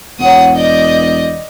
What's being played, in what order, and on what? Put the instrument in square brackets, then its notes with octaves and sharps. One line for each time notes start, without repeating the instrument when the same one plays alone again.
[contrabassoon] E1 [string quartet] C#5 F#5 D#6
[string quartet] D5 D#5 G6